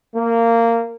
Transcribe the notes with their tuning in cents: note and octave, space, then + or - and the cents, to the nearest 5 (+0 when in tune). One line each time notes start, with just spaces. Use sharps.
A#3 -15